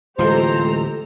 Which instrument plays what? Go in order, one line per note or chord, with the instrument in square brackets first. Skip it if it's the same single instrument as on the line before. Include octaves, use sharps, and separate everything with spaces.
[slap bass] D1 E3 [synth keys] G#3 F4 [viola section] G4 A4 A#5 [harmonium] C5